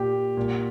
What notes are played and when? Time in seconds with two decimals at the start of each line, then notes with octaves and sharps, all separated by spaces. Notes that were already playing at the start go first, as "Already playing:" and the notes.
Already playing: A#2 G4
0.37 A#2